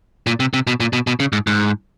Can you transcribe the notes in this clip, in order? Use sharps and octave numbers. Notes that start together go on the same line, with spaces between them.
A#2
C3
C3
B2
A#2
B2
B2
C#3
G#2
G#2